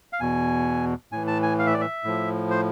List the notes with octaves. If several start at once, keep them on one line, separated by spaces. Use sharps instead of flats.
F5
E2 B2 G#5
A2 E3 G#5
A5
G#5
F5
E5
D5
E5
A2 F3
C5